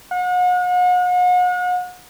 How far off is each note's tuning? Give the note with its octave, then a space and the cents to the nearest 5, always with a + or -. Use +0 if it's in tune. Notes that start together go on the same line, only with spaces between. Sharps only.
F#5 -40